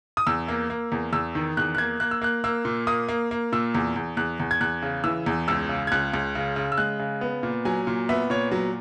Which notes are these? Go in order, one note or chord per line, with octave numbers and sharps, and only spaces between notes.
D#6
E2 E6
A#3
A#3
E2
E2 E6
D#3
E2 F#6
F#6
A#3 G#6
A#3 F#6
E6
A#3 F#6
A#3 E6
A#2
A#3 D#6
A#3
A#3
A#2 E6
E2
E2
E2 F#6
E2
G#6
E2 F#6
C#3
E3 E6
E2
C#2 E6
C#3
G#6
C#2 F#6
C#2
C#3
C#3
E6
G#3 F#6
C#3
B3
A#2
F#3 G#5
A#2
B3 E5
A#2 C#5
F#3